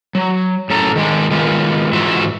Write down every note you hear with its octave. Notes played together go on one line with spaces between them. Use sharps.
F#3
F#2 A2 A4 A#5
D#3 G#3 D4
D#3 G#3 B3 F4
G#2 E3 F4 F#4 E5